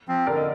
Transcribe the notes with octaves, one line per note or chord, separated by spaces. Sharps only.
F3 C4
D3 A#4 D5
D#5